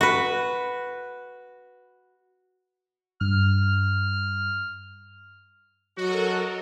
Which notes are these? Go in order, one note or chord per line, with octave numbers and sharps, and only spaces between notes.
F#4 B4
G2 F6
F#3 F#4 A4 A#4 D#5